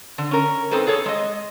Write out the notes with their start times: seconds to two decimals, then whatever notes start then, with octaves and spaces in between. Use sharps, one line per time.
0.18 D3
0.31 C#4 A#4
0.71 C4 D#4 A4 B4 C5
0.87 G#4 A4 C#5
1.06 G#3 D#5